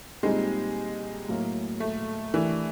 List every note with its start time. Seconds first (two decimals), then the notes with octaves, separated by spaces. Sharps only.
0.23 A#2 G3 G#3 C4 D#4 G4
1.28 A2 F#3 A#3
1.80 A3
2.33 E3 A3 D4 G4 A#4